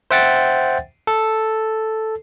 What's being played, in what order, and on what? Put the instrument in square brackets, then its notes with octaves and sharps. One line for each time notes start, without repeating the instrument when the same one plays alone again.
[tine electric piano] C5 E5 F#5 G5 A6
A4